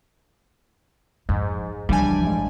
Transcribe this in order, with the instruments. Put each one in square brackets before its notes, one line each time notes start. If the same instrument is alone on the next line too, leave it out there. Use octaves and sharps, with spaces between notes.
[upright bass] F2 [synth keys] G#2
[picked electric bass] C#2 E3 D4 [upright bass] F3 C4 [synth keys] G3 G#5
[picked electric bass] A1 G2 G#3